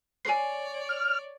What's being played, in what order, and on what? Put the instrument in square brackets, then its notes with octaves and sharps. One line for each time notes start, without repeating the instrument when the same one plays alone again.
[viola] C#5 D5 [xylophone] G#5 C7
[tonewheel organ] F6